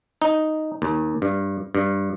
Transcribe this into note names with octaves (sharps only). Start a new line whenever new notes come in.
D#4
D#2
G2
G2